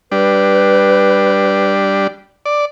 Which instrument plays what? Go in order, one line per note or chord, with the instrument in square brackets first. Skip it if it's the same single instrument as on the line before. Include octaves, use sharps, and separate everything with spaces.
[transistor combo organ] G3 D4 [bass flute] B4
[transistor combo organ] D5